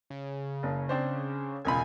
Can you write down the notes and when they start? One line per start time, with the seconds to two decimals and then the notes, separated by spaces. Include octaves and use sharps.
0.10 C#3
0.63 F#1
0.89 C4 D4 C5
1.65 E1 C#2 G#5 B5